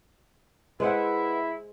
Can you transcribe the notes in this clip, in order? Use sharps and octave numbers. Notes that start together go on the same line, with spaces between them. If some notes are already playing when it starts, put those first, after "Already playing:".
G#3 E4 B4 C5 F#5